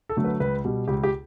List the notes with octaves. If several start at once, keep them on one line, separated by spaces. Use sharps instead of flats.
A4
D3 F#3 A3
B4
C#2 B4
B2 G3
C#2 G4
G4